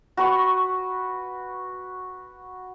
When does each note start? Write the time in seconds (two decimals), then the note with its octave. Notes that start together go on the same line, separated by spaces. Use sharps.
0.17 F#4 B4 C#6